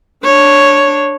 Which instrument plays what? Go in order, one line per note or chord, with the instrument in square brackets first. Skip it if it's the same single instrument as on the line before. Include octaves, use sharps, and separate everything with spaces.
[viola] D4 C#5